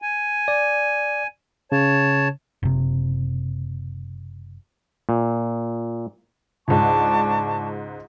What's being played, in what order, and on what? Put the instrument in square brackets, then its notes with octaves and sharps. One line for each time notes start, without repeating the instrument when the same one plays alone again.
[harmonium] G#5
[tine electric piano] D5
[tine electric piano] C#3 [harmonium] C#5 A5
[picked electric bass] F#1 C3
[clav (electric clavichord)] A#2
[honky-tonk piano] C#2 G#2 [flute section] D4 A5 C#6